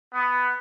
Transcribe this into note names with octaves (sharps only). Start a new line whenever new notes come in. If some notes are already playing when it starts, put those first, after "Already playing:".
B3